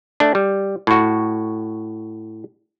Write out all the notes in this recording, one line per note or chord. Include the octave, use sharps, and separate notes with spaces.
A3 D4
G3
A2 F#4